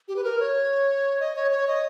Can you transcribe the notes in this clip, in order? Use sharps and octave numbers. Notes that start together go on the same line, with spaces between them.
G4
B4
A#4
C#5
D#5
C#5
C#5
D#5